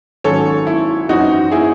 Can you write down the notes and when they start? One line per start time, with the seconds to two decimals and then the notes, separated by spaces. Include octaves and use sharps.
0.24 G#1 G#2 F#3 C#4 A4 C#5
0.67 E4
1.09 F#2 E3 C4 D#4 F#4
1.51 E4 G#4